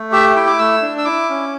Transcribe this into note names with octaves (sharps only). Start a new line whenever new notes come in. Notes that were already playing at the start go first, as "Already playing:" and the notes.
Already playing: A3
G4 E5
E4 G5
D6
A3 E6
D4
E6
E4 D6
C#4